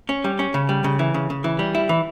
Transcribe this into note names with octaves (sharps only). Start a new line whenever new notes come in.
C#4
G3
C#4
C#3
G3
C#3
E3
C#3
C#3
E3
G3
E4
E3